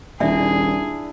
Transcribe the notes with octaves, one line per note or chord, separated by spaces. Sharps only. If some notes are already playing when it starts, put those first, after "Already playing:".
D#1 D4 E4 G#4 D5 E5 G#5